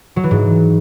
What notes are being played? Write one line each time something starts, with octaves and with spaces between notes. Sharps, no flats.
F#3
E3
G#2